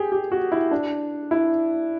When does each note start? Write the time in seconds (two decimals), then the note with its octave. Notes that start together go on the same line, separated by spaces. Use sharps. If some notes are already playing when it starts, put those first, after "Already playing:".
Already playing: G4 G#4
0.12 G4
0.32 F#4
0.52 E4
0.71 D4
1.31 E4